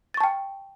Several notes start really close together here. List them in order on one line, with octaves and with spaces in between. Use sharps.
A6 C#6 A5 G5